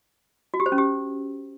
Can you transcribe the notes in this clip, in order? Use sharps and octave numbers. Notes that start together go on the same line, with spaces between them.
F#4
G4
C5
C#4
G4